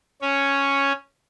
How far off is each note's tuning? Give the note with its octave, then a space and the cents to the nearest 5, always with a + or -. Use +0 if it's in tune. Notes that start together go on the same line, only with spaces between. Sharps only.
C#4 +0 C#5 +0